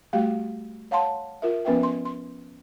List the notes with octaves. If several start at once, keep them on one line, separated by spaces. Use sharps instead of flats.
G3 A3 F#4 G4 F5 G5
C#5 F5 F#5 A5 C6
F4 A#4 E5
F3 B3 C#4 B4 E5 G5
C6
C6